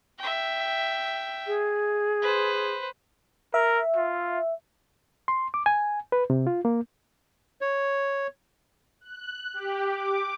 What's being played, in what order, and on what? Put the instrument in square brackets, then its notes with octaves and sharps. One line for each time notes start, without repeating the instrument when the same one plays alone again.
[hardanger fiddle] E5 G5
[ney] G#4
[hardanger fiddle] B4 C5
[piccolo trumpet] A#4 [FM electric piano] E5
[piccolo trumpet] F4
[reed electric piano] C6
D6
G#5
B4
C3
F4
A#3
[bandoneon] C#5
[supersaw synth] F#6
G4
D6